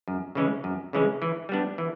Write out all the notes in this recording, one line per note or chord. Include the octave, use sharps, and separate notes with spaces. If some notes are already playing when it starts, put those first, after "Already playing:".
F#2
C#3 E3 G#3 C#4
F#2
C#3 E3 G#3 C#4
E3
G3 B3 D4
E3